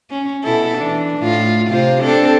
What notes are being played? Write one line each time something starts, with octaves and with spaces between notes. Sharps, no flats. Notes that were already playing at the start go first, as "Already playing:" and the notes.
C#4
B2 E4 A4
E3 D4
A2 F4
C3 F4 C5
C4 D4 A4